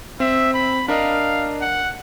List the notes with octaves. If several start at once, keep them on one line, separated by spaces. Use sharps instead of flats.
C4 E5
B5
D4 A#4 D#5 F5
F#5